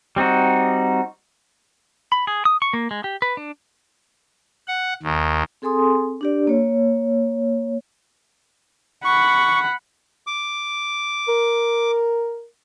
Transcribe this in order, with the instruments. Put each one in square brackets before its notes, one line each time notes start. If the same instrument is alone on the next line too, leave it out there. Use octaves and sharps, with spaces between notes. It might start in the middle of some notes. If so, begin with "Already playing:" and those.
[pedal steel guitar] G3 C4 D#4 F#4
B5
G#4
D#6
C#6
A#3
G#3
G4
B4
D4
[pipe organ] F#5
D#2
[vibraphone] C4 G#4 A4 G#5 C6 D#6
D4 G4 D5
A#3 C#5
[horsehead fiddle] F#5 B5 [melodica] C#6
[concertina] D6
[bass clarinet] A#4